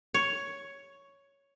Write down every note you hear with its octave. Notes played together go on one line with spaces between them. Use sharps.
C#5